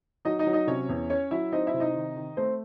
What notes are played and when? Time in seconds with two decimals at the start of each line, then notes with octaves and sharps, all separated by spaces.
0.25 F#3 D#4 D#5
0.39 D#4 D#5
0.47 F#3
0.53 D#4 D#5
0.67 C3 C#4 C#5
0.89 E2
1.10 C#4 C#5
1.31 F#3 E4 E5
1.52 C4 D#4 D#5
1.67 E4 E5
1.74 C3
1.80 D#4 D#5
1.95 D#3
2.16 D#3
2.37 A3 C4 C5